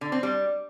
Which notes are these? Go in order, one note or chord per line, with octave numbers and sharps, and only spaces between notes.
D3
C4
G3